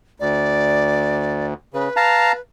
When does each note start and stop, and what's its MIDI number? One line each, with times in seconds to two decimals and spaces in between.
0.20 1.54 38
0.20 1.46 74
1.74 1.89 49
1.74 2.40 71
1.96 2.32 77
1.96 2.32 81
1.96 2.32 82